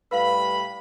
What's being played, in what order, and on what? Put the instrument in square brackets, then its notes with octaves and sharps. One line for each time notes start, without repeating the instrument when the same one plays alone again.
[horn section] A2 G3 B5 [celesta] B4 F5